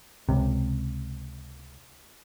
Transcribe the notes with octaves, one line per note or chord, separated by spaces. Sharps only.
C#2 C3